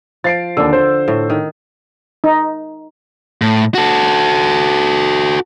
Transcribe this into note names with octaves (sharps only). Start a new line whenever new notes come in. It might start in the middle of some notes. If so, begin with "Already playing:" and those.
F3 A6 C7 D7
D#2 D3 D4 E6
C5
A2
D#3
D#4
A2
F#4 A4